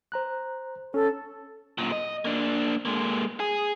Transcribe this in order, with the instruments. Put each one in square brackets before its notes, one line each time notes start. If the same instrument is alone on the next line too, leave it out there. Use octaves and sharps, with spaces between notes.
[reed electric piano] C5 A#5 F#6
[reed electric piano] C#4 [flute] A4
[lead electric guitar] F#2 A#2
D#5
A#3 D4
G#3 A#3
G#4